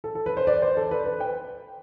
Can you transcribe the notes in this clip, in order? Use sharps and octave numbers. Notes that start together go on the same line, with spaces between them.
A4
A4
B4
C5
D5
C5
A4
B4
B4
G5